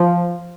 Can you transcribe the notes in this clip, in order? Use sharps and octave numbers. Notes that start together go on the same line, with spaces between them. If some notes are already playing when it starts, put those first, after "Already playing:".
Already playing: F3